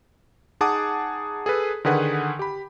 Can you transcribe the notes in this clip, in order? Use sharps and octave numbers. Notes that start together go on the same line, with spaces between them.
D#4 G#4 F#5 A5 D6 D#6
G#4 A4 B4
D3 D#3 G#4 B4 F#5
G4 B5